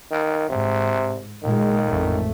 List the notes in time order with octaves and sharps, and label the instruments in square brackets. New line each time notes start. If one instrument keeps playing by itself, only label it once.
[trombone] D#3
[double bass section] G#2 [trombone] C3
[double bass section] A#2 G#3 [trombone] D#3
[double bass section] A1 F2 A3